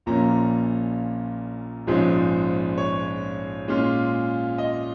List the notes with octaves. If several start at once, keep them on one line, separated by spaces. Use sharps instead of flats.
A#1 A#2 A#3 C#4 A#5
A#1 G#2 F3 G#3 C#4
C#5
A#2 G#3 C#4 F4
D#5